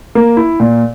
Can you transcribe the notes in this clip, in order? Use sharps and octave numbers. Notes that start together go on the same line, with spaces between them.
A#3
E4
A#2